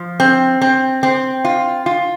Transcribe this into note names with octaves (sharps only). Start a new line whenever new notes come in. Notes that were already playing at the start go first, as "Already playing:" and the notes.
Already playing: F3
C4
C4
C4
F4
F4